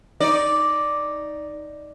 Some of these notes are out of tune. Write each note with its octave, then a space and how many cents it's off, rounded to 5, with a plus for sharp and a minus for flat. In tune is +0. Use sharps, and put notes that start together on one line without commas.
D#4 +5 D5 +0